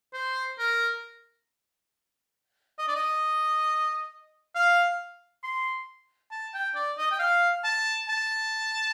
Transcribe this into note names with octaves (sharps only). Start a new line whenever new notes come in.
C5
A#4
D#5
D5
D#5
F5
C6
A5
G5
D5
D#5
G5
F5
A5
A5